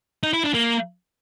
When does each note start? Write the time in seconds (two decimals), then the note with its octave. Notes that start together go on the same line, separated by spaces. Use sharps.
0.23 D#4
0.33 E4
0.44 D4
0.54 A#3